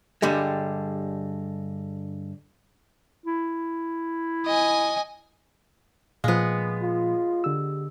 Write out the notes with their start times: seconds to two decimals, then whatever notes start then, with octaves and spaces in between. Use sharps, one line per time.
0.22 G2 D3 G3 G#3
3.26 E4
4.46 D#5 G#5
6.24 A#2 F3 G#3 B3 F5
6.82 F4
7.44 D3 G4 E6